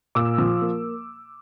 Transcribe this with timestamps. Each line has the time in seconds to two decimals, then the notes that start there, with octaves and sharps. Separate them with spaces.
0.15 A#2 D6 E6
0.38 F3
0.62 A#3